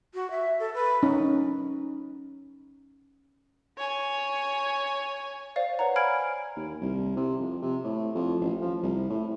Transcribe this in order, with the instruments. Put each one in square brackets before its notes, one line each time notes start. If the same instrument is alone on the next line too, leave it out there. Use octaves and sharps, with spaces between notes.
[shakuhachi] F#4
E5
A4
B4
[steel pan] C#4 D#4
[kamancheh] C#5 G#5
[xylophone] C5 D5 F5
B4 C#5 F#5 A#5
F5 G#5 B5 F6 G#6 D7
[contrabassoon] D#2
C2
C3
F2
C3
A2
F2
A1
F3
C2
A2